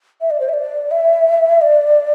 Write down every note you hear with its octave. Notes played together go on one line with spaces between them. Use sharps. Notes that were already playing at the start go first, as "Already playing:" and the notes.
E5
D5
C5
E5
D5
E5
D5